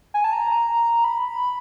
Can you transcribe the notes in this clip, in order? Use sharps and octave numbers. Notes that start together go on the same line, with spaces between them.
G#5
A5
A#5
B5